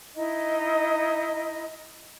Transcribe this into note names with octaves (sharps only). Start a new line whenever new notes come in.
D#4 E4 D#5